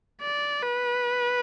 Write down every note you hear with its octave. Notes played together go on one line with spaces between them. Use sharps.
D5
B4